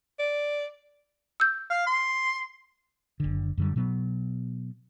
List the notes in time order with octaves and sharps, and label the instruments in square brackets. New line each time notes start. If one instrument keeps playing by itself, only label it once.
[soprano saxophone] D5
[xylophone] E6 G6
[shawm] F5
C6
[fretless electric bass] F#1 D3
F#2 D3 G3
B2 F#3 B3